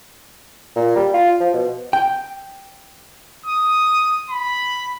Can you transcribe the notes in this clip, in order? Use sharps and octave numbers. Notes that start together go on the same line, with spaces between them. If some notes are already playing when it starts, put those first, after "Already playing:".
A#2
G3
F4
F3
B2
G5
D#6
B5